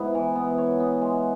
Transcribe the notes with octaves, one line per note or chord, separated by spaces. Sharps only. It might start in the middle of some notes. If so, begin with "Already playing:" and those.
Already playing: G#2 B3 E4
E3
B3
C#5
B3
G#3